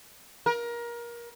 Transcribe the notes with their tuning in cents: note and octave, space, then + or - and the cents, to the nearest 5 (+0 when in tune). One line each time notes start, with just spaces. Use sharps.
A#4 +25